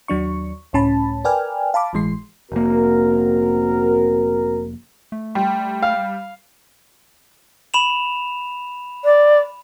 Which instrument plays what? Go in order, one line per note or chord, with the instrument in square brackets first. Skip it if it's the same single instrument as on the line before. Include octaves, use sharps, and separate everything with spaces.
[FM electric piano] D#2 F#3 D4 C#6
C#2 A2 C#4 A5 B5
A#4 B4 D5 G5 G#5 F6
F5 A5 B5 D6
G1 A2 E3 G#3 C6 C7
[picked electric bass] F1 A#3 [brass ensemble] C4 F#4 A#4
[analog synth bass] A3
[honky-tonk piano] G3 [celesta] G5 C6
[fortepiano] F5
[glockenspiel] B5 E7 F7
[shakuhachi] D5